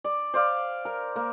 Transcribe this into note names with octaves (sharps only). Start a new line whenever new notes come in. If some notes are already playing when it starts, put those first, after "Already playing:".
D5
C5 D5 F5
A#4
A#3